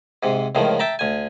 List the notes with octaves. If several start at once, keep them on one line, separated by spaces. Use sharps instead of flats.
G#2 C3
C#2 A2 D#3 F3
E5 G5 A5 A#5
D2 G#5